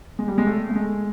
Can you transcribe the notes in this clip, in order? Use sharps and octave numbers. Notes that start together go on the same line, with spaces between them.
G#3
G3
G#3
A3
A3
G#3